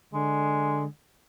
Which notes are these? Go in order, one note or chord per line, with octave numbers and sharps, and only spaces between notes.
D3 G#3